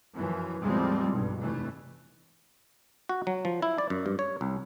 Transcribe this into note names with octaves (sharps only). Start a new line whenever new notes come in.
F#2 E3 F3
E2 A2 F3 G3 G#3 C4
B1 G2
F1 E3 A3
F#4
F#3
F3
E4
D5
F#2
G2
C#5
C2